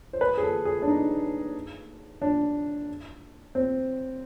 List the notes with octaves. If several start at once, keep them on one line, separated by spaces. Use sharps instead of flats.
C5
B4
G#4
A4
G#4
D4
D#4
D4
C4